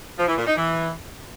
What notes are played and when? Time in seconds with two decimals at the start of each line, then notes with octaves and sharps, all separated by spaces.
0.18 F3
0.28 E3
0.37 A#2
0.47 D#4
0.56 E3